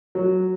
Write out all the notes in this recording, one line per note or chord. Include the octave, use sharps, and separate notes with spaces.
F#3